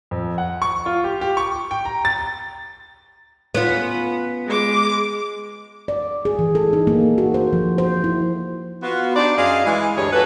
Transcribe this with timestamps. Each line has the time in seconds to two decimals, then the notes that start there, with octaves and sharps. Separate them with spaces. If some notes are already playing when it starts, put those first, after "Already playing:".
0.11 F2
0.38 F#5
0.62 C#6
0.86 F4
1.04 G4
1.21 G4
1.37 C#6
1.71 G5
1.85 A#5
2.05 A6
3.55 B3 C#4 F4
4.47 G#3 D6
5.88 D5
6.25 G#4
6.39 E3
6.55 A4
6.73 D#4
6.87 A#3
7.18 F#4
7.34 C5
7.53 F3
7.78 C5
8.04 E4
8.83 B3 F4 F#4
9.16 D4 D#4 G4 C5 D5
9.37 F#2 G#4 D#5 F5
9.65 E3 G#3
9.97 D2 G2 G3 A#3 G#4 C#5
10.12 F3 F#4 G#4 A4 B4